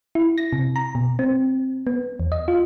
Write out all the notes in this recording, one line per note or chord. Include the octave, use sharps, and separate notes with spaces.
E4
A#6
C3
A#5
B2
C4
B3
E2
D#5
F4